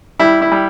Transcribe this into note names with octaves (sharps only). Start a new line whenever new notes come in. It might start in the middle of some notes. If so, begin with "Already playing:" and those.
G3 E4
E4
G3